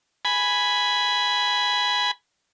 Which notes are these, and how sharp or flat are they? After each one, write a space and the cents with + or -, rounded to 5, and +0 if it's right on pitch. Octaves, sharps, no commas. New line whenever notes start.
G#5 +0 B5 +0